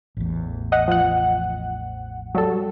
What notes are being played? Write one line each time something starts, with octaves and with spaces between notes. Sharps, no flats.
A1 E2
D#5 F#5
F3 F#5
F#3 G3 A4